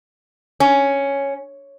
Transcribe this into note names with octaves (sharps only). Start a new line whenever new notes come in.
C#4